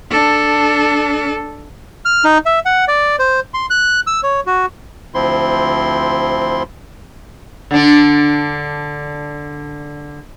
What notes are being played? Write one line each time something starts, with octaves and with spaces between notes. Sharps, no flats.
D4 A4
F6
D#4
E5
F#5
D5
C5
C6
F#6
E6
C#5
F#4
D2 F3 C4 E4 C6
D3 D4